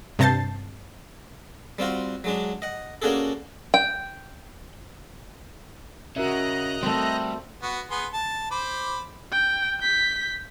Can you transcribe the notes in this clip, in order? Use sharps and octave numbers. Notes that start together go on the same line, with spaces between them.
G2 C3 A5 G6 A6 C7
G3 C4 F4 F#4
F#3 G#3 D4
D#5 F#5
A#3 C#4 D4 F#4 G#4 A4
G5
C#3 F#4 A#4 D#5 E5 A#5 F#6
G3 A3 C4
B3 F#4
B3 G#4 C6
A5
C5 B5 D6
G5
G6 B6